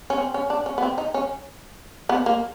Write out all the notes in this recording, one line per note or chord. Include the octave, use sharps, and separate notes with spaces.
C#4
C4
C#4
D4
C#4
B3
C4
D#4
C#4
B3
A#3